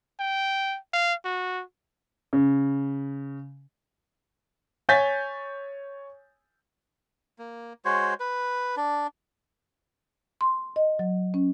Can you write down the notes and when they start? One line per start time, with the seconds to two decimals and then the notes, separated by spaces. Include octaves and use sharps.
0.20 G5
0.93 F5
1.25 F#4
2.33 C#3
4.89 C#5 G#5 G6 A6 B6
7.39 A#3
7.85 G#3 F#4 C5 C#5
8.20 B4
8.77 D4
10.41 C6
10.76 D#5
10.99 F#3
11.34 C#4